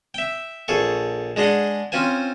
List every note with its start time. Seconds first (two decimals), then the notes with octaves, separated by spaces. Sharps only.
0.14 E5 G5
0.68 A#1 G#4 A4 C#6
1.36 G#3 D4 G#4 D#5 F#5
1.92 C4 C#4 F4 C5 G#5